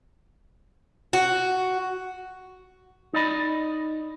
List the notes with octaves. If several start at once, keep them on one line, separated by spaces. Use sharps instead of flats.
F#4
D#4 D5 D#5 B5